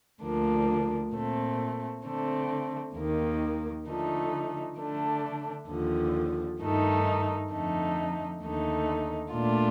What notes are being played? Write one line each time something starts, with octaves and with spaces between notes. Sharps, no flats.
D2 D3 F3 A#3 D4
A#2 A3 C4
D3 A3 C4
D#2 D#3 A#3
D3 F3 A3 D#4
D3 A3 D4
D#2 D3 F3
G2 D#3 A3 D#4
F2 D3 A3 D#4
D#2 D3 A3 D#4
A#2 A3 D4 F4